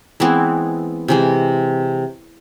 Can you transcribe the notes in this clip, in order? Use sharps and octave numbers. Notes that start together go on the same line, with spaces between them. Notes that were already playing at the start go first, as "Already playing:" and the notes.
E3 G#3 B3 C4 E4
C3 E3 G#3